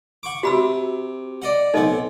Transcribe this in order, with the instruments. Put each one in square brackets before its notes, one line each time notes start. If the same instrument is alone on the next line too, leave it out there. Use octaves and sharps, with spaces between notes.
[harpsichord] F#5 C#6 D6
[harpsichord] C3 [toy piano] F#4 B5 E6
[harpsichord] D5 D#5 F#5
[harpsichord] B1 C4 F#5 [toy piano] D#4 A4 D#5